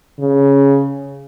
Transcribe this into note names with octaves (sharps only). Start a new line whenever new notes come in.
C#3